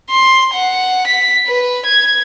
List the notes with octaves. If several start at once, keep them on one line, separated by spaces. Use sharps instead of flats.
C6
F#5
B6
B4
G#6